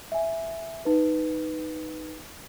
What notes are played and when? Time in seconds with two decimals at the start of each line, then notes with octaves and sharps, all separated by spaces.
0.12 E5 G#5
0.85 D#4 B4